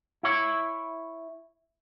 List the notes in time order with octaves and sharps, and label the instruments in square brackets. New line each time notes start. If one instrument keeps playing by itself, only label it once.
[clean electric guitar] E4 C#5